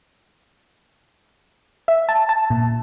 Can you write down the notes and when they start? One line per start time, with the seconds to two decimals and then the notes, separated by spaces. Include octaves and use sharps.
1.88 E5
2.09 A5
2.29 A5
2.50 A#2